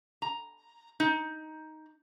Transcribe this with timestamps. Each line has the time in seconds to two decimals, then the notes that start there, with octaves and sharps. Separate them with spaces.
0.22 A#5
1.00 D#4